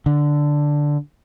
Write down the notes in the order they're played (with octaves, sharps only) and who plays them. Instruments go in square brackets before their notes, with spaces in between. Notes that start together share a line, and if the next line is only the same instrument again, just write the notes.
[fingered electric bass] D3